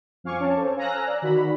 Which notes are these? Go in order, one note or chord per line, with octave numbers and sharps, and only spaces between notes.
F2 C4 F5 G#5 C#6 D6
C#4 C#5 A5
A4 C5
F5 G#5 A#5 E6 F#6 A#6
D5
D#3 F#4 B5